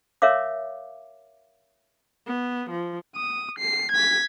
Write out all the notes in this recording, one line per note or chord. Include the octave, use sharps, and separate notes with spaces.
A#4 C#5 E5 F5 D6
B3
F3
D#6
C7
G#6 B6